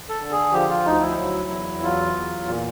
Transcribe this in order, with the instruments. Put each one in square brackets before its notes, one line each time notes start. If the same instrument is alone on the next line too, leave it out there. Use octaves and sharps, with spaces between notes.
[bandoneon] A4
D3
G#4
F3 G4
F4
D2 D#4
E4
F#3
E2
F#3 F4
E2
A#2